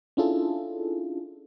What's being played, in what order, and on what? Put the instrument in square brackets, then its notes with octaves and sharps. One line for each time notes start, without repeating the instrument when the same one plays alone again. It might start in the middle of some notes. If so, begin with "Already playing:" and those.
[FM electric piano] C#4 D4 E4 F4 G#4 A4